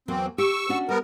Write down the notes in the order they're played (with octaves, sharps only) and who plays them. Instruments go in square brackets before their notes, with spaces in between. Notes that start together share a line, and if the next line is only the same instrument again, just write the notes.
[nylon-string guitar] E2 F#3 A#3 [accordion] C4
[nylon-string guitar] G4 [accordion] C#6 E6
[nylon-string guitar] C#4 D4 F#4
[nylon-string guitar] G3 [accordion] B3 A#4